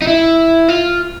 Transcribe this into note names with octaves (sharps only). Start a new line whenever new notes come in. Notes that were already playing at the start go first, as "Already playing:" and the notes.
D#4
E4
F4